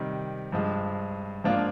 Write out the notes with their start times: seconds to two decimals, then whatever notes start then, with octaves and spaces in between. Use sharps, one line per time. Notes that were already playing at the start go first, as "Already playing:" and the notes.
Already playing: C3 D#3 G3
0.52 G2 F3 G#3
1.44 G#2 F3 A#3 D4 F4